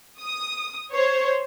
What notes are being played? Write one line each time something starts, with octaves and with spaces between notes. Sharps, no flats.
D#6
C5 C#5